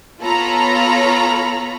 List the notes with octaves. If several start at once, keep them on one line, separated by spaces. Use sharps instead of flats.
B3 F4 A4 C#5 A#5 B5